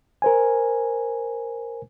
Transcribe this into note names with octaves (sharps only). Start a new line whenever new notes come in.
A#4 C5 G#5